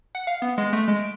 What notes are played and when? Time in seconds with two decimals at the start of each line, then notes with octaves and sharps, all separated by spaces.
0.15 F#5
0.27 F5
0.42 B3
0.58 G#3
0.73 A3
0.88 G#3
1.00 D7